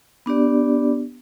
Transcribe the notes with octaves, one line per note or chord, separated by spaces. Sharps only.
B3 D4 G4 D5